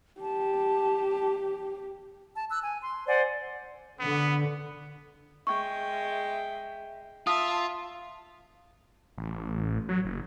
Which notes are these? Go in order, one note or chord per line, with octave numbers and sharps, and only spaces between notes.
G4 A5
A5
E6 F#6
G#5
C6
C5 D5 F#5 G#5
D3 B3
G#3 E5 G5 C#6
F4 E5 A5 D#6
A1
F#3
F#1